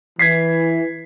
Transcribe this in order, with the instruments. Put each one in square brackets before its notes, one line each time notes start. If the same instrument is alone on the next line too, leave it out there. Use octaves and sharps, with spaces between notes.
[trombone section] E3 [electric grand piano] G#6 B6 C7